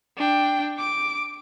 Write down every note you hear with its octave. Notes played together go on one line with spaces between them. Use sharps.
D4 G5
D6 D7